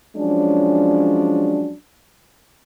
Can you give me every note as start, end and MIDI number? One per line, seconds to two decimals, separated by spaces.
0.17 1.73 53
0.17 1.73 54
0.17 1.73 56
0.17 1.73 61
0.17 1.73 62